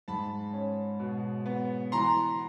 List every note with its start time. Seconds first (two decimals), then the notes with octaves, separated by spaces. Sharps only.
0.08 G#2 A5 B5
0.53 C#4
0.99 B2
1.46 B3
1.92 E3 A#5 C6